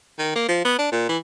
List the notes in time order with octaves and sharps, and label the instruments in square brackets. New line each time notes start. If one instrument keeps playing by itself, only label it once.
[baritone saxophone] D#3
A#3
F3
B3
D4
A#2
E3